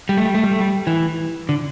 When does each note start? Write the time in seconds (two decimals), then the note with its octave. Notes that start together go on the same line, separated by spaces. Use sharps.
0.09 G3
0.17 A3
0.26 G3
0.35 A3
0.43 G3
0.52 A3
0.60 G3
0.87 E3
1.49 D3